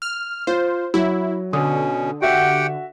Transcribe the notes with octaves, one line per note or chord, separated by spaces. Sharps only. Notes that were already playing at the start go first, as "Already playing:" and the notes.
F6
F4 C5
F#3 E4
B2 D3 C#4 D#6
F#4 G4 E5 F#5 G5